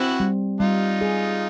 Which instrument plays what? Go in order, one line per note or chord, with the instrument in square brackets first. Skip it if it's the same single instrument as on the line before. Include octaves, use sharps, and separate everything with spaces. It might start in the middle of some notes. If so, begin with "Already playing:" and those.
Already playing: [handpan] C4 [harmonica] E4 F#4
[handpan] G3
[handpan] G3 [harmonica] D#4 F4
[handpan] G#4